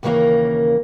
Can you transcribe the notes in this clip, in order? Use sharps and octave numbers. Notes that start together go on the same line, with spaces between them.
D#2 C#3 E3 G3 A#3 A#4